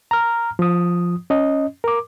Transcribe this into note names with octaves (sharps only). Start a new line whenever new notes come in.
A#5 F6
F3 D#6
C#4 D#5
A#4 D6